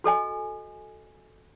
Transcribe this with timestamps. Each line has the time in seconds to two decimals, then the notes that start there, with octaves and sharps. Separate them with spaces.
0.04 F#4 A4 D#5 G#5